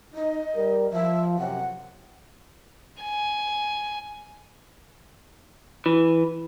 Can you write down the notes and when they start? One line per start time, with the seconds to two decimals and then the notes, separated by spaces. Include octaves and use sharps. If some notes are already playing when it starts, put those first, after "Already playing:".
0.14 D#4 D#5
0.56 G3 A#4
0.93 F3 E5
1.39 F#2 C3 F#5
3.03 G#5
5.86 E3